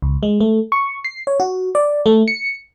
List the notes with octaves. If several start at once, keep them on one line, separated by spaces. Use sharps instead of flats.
C#2
G#3
A3
C#6
C7
C#5
F#4
D5
A3
C#7